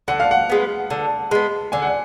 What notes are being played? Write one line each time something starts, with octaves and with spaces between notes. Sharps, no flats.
D3 F#5
F5
F#5
G#3 B3
D3
G#3 B3
D3 G#5
F#5